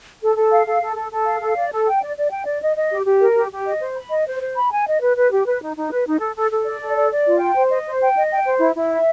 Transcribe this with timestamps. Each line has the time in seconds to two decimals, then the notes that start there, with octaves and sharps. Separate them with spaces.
0.22 A4
0.36 A4
0.50 F5
0.66 A4
0.81 A4
0.95 A4
1.11 A4
1.26 F5
1.40 A4
1.55 D5
1.71 A4
1.86 G5
2.02 D5
2.17 D5
2.30 G5
2.45 D5
2.61 D#5
2.76 D#5
2.91 G4
3.06 G4
3.20 A#4
3.36 G4
3.51 G4
3.66 D#5
3.80 C5
3.96 B5
4.10 D#5
4.26 C5
4.41 C5
4.56 B5
4.71 G#5
4.86 D#5
5.00 B4
5.16 B4
5.31 G4
5.45 B4
5.61 D#4
5.76 D#4
5.91 B4
6.06 D#4
6.20 A4
6.35 A4
6.50 A4
6.66 D5
6.80 A4
6.96 D5
7.11 D5
7.26 F4
7.40 G5
7.56 C5
7.70 D#5
7.86 C5
8.01 G5
8.16 D#5
8.31 G5
8.45 C5
8.60 E4
8.75 E4
8.91 E5